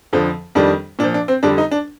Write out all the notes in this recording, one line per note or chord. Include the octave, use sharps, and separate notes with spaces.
F2 D3 F3
F2 D#3 G3 D4
A#2 F3 D4
D4
C4
F2 D3 G3 D4
D#4
D4